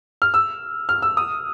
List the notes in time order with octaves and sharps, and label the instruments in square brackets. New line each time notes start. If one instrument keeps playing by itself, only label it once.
[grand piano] F6
E6
F6
E6
D#6